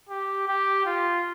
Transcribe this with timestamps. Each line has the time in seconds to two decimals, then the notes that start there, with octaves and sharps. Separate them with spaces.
0.09 G4
0.48 G4
0.86 F4